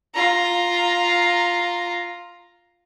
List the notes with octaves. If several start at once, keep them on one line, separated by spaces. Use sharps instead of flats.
F4 A#5